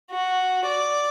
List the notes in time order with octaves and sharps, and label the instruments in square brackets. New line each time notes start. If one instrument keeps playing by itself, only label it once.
[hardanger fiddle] F#4
D5